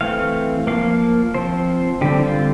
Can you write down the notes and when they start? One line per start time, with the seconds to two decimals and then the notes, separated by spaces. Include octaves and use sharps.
0.01 E3 A3 C4 F5
0.67 F3 A#3 F5
1.34 F3 C4 C5
2.01 D3 G3 C4 G4
2.24 F4